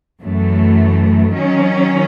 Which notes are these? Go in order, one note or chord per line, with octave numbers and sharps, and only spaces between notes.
F#2 E3 A3
D#3 F#3 C#4